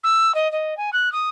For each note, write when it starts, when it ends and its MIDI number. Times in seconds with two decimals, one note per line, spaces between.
0.03 0.34 88
0.35 0.50 75
0.52 0.77 75
0.77 0.90 80
0.93 1.12 90
1.12 1.29 87